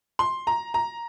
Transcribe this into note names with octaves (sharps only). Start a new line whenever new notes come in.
C6
A#5
A#5